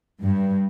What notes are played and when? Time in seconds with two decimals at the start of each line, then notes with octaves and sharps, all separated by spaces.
0.22 G2